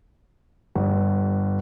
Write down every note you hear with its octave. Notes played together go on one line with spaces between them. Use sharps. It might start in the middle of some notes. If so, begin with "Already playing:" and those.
G1